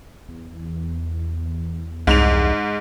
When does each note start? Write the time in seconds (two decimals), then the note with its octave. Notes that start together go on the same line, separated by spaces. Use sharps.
0.29 E2
2.07 C2 G#2 F7